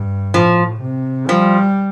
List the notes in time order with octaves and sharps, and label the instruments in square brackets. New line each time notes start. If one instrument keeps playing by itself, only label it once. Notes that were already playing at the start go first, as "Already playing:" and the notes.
Already playing: [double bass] G2
[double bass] A2 [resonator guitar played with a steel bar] F3
[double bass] C3
[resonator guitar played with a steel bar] F3 [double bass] G3